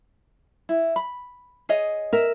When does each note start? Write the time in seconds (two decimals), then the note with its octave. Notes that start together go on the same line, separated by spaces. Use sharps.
0.69 E4
0.96 B5
1.69 G#4 C#5 D#5
2.13 A#4 E5